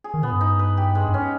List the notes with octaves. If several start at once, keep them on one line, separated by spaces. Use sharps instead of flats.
G#4
D#3
A#2 B3
G2
D#4
B4
G4
G#3
G2
C#4